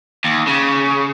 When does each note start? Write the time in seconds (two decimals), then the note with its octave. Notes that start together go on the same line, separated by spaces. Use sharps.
0.24 D#2
0.47 C#3